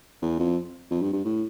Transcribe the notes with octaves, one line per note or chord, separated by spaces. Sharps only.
E2
F2
F2
G2
G2
A2